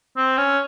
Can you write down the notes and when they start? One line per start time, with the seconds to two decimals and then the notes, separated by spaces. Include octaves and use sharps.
0.17 C4
0.38 C#4